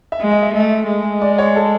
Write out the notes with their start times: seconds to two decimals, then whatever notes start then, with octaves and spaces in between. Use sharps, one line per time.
0.12 E5
0.20 G#3 D#5
0.31 D#5
0.43 E5
0.54 A3 D#5
0.88 G#3
1.22 D5
1.38 C#5
1.56 A4